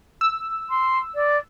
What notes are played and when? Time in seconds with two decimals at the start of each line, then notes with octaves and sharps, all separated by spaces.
0.21 E6
0.69 C6
1.15 D5